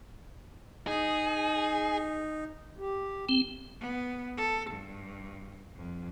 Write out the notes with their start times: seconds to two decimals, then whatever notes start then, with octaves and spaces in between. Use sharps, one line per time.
0.87 D#4 G#4
2.78 G4
3.29 C4
3.81 B3
4.38 A4
4.70 G2
5.76 F2